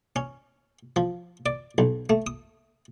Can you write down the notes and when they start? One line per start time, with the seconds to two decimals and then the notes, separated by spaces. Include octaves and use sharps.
0.16 C#4
0.96 F3
1.46 D5
1.78 B1
2.10 A3
2.27 D#6